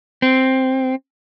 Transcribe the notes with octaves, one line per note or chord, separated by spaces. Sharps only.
C4